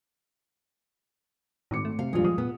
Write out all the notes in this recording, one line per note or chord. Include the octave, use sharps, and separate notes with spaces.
G#1 A2 D6 C#7
A3
C3 F5
D#1 A#1 G2 G#3 F4
F3 D#6
A#2 B3